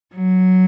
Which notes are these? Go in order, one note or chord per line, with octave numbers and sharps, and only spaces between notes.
F#3